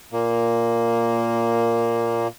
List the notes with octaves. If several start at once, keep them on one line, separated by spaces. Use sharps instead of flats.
A#2 A#3